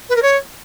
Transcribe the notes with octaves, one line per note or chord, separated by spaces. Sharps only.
B4
A#4
C#5